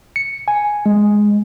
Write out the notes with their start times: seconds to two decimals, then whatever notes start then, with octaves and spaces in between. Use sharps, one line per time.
0.16 C#7
0.48 G#5
0.86 G#3